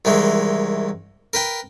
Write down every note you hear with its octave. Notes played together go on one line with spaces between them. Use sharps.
C2 D#3 E3 G#3
A#4 B4 G5